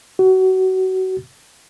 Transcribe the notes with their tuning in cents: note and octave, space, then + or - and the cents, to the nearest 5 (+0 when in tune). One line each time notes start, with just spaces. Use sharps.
F#4 +25